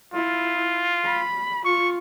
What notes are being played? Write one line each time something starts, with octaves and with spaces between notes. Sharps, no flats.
E4 F4
B5
F4 C#6